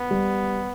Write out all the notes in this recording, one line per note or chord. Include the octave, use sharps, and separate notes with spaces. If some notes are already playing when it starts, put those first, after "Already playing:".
Already playing: B3
G3